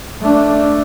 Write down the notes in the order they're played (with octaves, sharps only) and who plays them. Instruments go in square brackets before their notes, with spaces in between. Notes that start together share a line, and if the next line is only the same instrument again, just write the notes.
[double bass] A3 D4